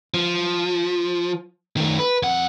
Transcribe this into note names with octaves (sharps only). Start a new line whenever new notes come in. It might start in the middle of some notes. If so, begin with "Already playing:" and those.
F3
D#3 A3
B4
F2 F#5